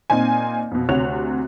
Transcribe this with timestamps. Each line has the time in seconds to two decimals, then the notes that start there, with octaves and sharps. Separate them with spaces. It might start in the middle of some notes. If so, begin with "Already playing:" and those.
0.10 A#2 C4 D#4 G#5
0.71 F2 B2
0.89 D2 C3 F#4 C#5 F#6 F7